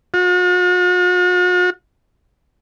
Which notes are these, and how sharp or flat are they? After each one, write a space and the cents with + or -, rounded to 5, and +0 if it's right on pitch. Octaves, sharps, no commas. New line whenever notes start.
F#4 -45